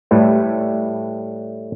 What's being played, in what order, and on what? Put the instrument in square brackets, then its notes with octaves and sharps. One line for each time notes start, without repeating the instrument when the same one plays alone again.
[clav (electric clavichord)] A2 G3 A3 B4